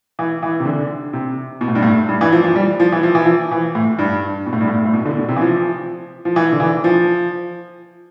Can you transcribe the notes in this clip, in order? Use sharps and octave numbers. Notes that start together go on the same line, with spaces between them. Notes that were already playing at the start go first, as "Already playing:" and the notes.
E3
E3
C3
D3
C3
B2
A2
G2
A2
G2
E3
F3
F3
G3
F3
E3
F3
E3
F3
E3
A2
G2
B2
A2
G2
A2
A2
B2
D3
B2
C3
E3
F3
F3
E3
D3
E3
F3